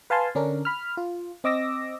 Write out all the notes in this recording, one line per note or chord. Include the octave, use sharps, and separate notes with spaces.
B4 F5 G#5 A5 C6
D3 C#4 D4 A#4
B5 F6
F4
C4 D#5 D6 E6 A#6